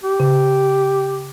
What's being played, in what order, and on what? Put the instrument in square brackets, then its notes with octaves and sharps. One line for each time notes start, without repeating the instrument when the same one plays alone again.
[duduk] G4
[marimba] C#3